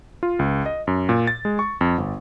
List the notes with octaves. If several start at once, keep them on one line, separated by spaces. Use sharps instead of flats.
F4
C#2
D#5
F#2
A#2
A6
G#3
C#6
F2
G1